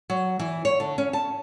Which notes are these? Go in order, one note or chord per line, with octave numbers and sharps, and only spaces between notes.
F#3
E3
C#5
D3
C#4
A5